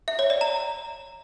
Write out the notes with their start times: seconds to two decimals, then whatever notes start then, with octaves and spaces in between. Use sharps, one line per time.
0.08 E5
0.19 C#5
0.30 D5
0.41 A#5